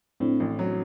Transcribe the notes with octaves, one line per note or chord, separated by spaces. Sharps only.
A2 C4 D4
A1
F#3